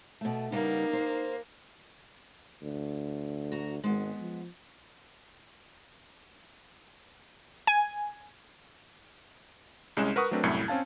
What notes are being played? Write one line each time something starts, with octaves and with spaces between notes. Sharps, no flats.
B2 A3
C#3 G3 A#3 B3 D#4
C5
D2
F#4 A#5
G#1 G#3 B3
F3
G#5
C2 G#3 C#4 E7
A#4 B4 F#5 C#6 D#6
F#3 A3 C4 D4 A#4 B4
C2 F#2 A2 E4 G#6 C#7
C4 C#4 F5 A5